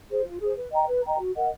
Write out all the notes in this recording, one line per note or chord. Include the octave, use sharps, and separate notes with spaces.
G#4 C5
F4
G#4 C5
B4
D#5 G5 A#5
B4
D#5 G5 A#5
F#4
A#4 D#5 F#5